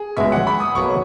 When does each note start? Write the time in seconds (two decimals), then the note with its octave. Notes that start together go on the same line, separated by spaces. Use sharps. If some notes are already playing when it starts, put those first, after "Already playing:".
Already playing: G#4
0.17 C#2 B2 G#3 E5
0.32 F#5
0.47 B5
0.60 D#6
0.75 B1 B2 F#3 A#3 C#6